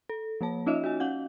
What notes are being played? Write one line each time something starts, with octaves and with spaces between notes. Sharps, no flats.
A4
F3 A#3 C#5 A5
C#4 D#4 F4 C#5 D#5 E5
F#4 D#5 G#5
C#4 F5 F#5 G6